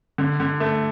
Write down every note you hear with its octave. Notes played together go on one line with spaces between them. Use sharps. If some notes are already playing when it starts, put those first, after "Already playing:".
D3
D3
A3